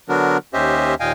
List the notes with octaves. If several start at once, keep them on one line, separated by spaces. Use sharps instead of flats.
D3 F#3 B3 D4 F#4 A#4
D#2 C#4 G4 C5 D#5 E5
D#2 A#2 D#5 F5 G5 G#5